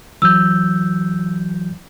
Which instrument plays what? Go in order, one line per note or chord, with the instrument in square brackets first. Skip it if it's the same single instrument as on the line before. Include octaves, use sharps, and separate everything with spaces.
[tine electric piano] E3 F#3 G6 [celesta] E6